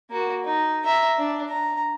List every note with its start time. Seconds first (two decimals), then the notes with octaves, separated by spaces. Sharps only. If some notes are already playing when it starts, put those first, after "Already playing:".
0.10 A#3 F#4
0.44 D#4
0.84 E5 A#5
1.18 D4
1.49 A#5